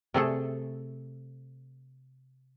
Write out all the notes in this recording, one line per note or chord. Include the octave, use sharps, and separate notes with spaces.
C3 A3 G#4 A4